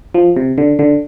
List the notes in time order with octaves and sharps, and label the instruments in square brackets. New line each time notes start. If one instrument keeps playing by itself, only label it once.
[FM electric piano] F3
C3
D3
D3